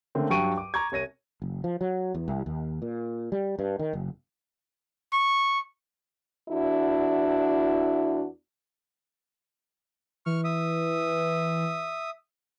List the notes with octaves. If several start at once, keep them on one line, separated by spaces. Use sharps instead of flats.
D3 A3 A#3 C4 C#4
G2 F#3 G5 C#6 D7 D#7
D6
A#5 C#6 D6 G#6
C2 C#5 A#6 D#7
F#1
F3
F#3
E2
C2
D#2
A#2
G3
G2
D#3
F#1
C#6
E2 D4 E4 F#4
E3 C#6 F6
E5 D#6